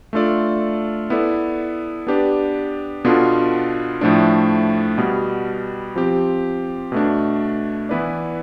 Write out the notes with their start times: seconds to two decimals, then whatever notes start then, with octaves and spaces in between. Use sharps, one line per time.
0.13 A3 D4 F4 A4 D5
1.10 B3 E4 A4 D5
2.07 B3 D4 G4 B4 D5
3.04 B2 B3 D4 F4 A4
4.01 A2 F3 A3 D4
4.98 B2 G3 B3
5.96 F3 C4 G4
6.92 B2 A3 D4
7.89 E3 B3 E4 B4 D5